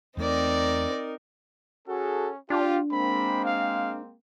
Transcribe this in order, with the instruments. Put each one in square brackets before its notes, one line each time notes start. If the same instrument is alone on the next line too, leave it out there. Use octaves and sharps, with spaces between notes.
[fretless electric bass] E2 A3 [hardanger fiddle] C4 D5 [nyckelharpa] D#4 A#4
[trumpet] C#4 [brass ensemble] F#4 G#4 A4
[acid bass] D4 [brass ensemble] F4 [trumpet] G4
[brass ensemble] G#3 A#3 C4 [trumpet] B5
[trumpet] F5